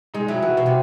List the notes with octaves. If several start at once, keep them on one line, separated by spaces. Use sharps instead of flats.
G#3 D#4
F#3 E4
E3 F#4
B2
C3